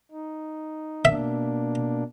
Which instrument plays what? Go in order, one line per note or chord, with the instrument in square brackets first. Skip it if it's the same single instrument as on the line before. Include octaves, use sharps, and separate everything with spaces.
[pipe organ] D#4
[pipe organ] B2 A#3 D4 [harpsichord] E5